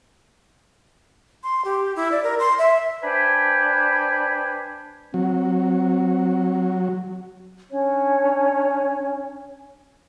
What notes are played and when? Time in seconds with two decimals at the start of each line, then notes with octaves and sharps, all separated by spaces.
1.44 C6
1.65 G4
1.96 E4
2.12 D5
2.23 A#4
2.40 C6
2.59 E5
3.03 D4 B4 C5 G5 G#5 B5
5.14 F#3 C4
7.71 C#4 D4 C#5